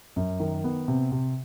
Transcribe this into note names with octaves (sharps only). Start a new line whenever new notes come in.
F#2
D#3
B3
C3
C3